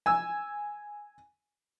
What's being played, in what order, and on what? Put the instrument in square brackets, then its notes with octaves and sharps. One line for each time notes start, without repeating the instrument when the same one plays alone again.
[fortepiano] G#5 E6